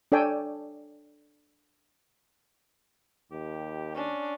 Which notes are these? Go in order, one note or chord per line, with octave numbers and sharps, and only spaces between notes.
D4 A4 C#5 D5 G5 G#5
D#2 G4
C#4 D4